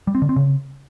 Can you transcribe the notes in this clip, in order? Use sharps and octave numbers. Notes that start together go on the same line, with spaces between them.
G3
C4
D3
C4
C#3